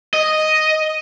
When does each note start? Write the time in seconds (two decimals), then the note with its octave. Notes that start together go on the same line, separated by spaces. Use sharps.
0.14 D#5